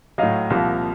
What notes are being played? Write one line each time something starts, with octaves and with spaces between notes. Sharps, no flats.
A2 F#3 D#5 F5
C2 A#2 F3